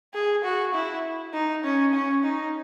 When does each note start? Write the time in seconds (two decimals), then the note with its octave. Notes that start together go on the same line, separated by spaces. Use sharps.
0.14 G#4
0.44 F#4
0.75 E4
1.34 D#4
1.64 C#4
1.93 C#4
2.24 D#4